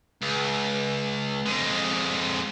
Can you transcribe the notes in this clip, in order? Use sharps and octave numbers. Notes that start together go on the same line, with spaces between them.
C#2
F2 G#3